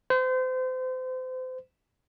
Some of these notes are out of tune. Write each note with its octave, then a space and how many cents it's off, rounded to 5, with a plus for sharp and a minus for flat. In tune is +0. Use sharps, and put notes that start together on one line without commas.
C5 -35